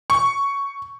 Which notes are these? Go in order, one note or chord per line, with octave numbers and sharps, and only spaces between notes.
C#6